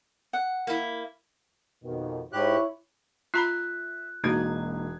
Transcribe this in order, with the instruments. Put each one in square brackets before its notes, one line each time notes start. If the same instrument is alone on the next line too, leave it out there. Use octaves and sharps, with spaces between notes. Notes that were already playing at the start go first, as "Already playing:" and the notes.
[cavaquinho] F#5
[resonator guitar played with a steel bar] A#3 E4
[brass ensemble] F2 B2 D#3
[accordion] G#2 G4 F#6 [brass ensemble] E4 C#5
[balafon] F4 A#5 B5 [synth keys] E5 [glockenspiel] F#6
[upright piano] E1 G#6 [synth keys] A#3 D#4 [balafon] F#4